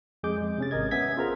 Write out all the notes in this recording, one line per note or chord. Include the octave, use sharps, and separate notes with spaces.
F2 G#3 G#4 D6 G6
G#3
C3 C#4 A6
G#1 A#4 D#5 G#6
B3 C#4 E5 G#5 G#6 B6
F4 G#4 A#4 C5 A#5